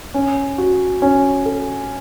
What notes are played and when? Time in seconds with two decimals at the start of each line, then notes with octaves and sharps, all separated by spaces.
0.14 C#4
0.58 F#4
1.02 C#4
1.46 A4